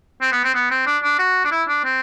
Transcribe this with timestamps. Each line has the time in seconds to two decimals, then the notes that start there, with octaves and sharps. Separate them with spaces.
0.21 C4
0.32 B3
0.44 C4
0.55 B3
0.71 C4
0.86 D4
1.03 D4
1.19 F#4
1.45 D4
1.51 E4
1.69 D4
1.84 C4